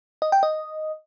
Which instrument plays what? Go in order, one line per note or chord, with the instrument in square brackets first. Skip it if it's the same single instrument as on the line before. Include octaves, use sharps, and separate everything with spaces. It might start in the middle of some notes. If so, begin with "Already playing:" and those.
[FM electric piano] D#5
G5
D#5